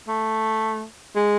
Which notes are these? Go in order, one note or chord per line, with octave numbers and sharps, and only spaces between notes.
A3
G#3